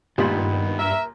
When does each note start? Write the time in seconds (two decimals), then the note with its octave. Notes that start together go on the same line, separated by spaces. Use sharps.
0.18 C#2 G2 A#2 D#3 G3 B3 B5
0.79 A#4 E5